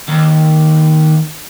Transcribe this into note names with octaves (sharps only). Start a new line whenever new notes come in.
D#2